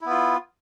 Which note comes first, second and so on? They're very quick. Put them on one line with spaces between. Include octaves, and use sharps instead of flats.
E4 B3 F4